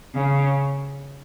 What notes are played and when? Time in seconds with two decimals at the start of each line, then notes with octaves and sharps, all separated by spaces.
0.14 C#3